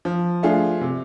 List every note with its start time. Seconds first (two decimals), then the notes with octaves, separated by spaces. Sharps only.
0.05 F3
0.43 A3 D4 F4 G#4
0.81 C3